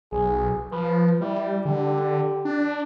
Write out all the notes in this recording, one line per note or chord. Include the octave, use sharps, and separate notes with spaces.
B1 G#4
F3 B4
G3 E4
D3 G4
D4